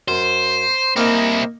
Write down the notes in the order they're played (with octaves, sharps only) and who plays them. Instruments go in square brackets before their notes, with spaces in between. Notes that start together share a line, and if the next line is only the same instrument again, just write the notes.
[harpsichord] F#2 [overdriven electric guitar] C5
[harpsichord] A#3 D#4 A#4 [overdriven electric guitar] C4 E4